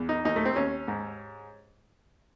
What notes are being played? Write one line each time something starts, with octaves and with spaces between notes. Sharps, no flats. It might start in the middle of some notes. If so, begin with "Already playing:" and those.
Already playing: E2
D#4
D#2 D#4
A3
C4
D#2 C#4
G#2